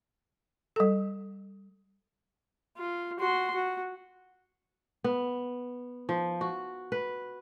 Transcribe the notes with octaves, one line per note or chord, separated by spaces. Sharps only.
G3 A4
F4
F#4 C6
F#4
B3
F3
F#4
B4